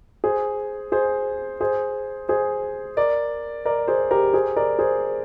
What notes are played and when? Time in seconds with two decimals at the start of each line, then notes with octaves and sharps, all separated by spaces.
0.24 G#4 C5
0.92 G#4 C5
1.61 G#4 C5
2.29 G#4 C5
2.97 A#4 D5
3.66 A#4 D5
3.88 G#4 C5
4.11 G4 A#4
4.33 G#4 C5
4.56 A#4 D5
4.79 G#4 C5